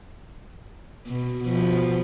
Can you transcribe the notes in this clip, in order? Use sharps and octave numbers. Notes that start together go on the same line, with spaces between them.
B2
B2 F3